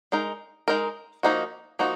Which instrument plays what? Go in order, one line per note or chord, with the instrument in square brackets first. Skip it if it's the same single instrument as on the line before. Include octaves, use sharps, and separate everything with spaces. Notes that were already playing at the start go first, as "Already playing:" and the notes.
[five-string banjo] G#3 D#4 A#4
G#3 D#4 A#4
F3 A#3 D#4 F#4
F3 A#3 D#4 F#4